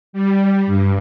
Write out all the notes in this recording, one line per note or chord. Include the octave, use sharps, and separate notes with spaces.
G3
G2